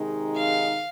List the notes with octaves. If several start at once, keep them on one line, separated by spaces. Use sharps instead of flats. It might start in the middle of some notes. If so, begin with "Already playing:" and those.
Already playing: C3 D#3 G#3 D#4
F5